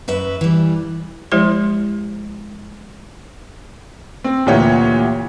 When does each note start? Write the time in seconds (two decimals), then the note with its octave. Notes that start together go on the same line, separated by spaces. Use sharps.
0.08 F#2 B4 E5
0.41 E3 G3
1.32 F3 G#3 E4 G4 C5 C6
4.24 C4
4.46 D2 A#2 E3 G4 C#5 F#5